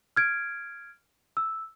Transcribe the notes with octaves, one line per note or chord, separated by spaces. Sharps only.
F6 G#6 D7
E6